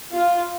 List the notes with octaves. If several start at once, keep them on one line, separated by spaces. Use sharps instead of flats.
F4